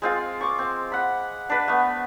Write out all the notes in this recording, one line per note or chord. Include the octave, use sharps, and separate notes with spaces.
G#3 C4 F4
C#6 D6
C4
F#5 B5
D4 B4
A3 B3